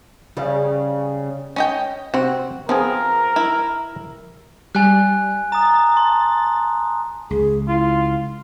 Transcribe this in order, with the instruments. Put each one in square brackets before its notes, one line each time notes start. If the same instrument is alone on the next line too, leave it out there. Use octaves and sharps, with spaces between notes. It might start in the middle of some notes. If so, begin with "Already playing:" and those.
[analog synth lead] C#3 [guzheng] G3
[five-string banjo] C#4 D#5 G5
[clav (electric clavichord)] C3 C4 [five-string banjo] F#4
[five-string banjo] F3 [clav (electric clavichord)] B3 C4 G#4 [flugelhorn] A#4
[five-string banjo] E4
[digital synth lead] G3 [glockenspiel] G#5 F#6
[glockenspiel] A#5 D#6 [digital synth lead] A6
[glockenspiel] A5 C6
[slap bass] C#2 [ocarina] G#4
[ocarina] E4 [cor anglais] F4